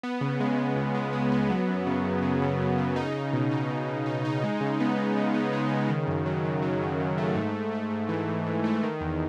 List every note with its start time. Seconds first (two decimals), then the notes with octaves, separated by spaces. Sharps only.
0.03 B3
0.21 C#3
0.40 G#3
0.58 G#3
0.76 C#2
0.94 G#3
1.13 G#3
1.32 B3
1.50 F#3
1.68 F#2
1.86 C#3
2.05 F#2
2.23 C#3
2.42 C#3
2.60 F#2
2.78 C#3
2.96 D#4
3.14 D#4
3.33 B2
3.51 D#4
3.69 B2
3.88 B2
4.06 D#4
4.25 D#4
4.43 G#3
4.61 C#3
4.80 B3
4.97 B3
5.17 C#3
5.34 B3
5.53 G#3
5.72 C#3
5.89 D#3
6.07 F#2
6.26 F#3
6.45 F#2
6.62 F#3
6.82 F#2
7.00 F#2
7.18 A3
7.36 G#2
7.54 G#2
7.73 A3
7.91 G#2
8.09 E3
8.28 G#2
8.46 G#2
8.64 A3
8.83 D#3
9.01 E2